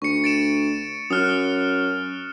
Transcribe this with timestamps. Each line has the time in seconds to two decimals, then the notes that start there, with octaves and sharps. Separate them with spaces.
0.02 D2 C#6 C#7
0.24 A6 D7 E7
1.10 F#2 D#6 F6 F#6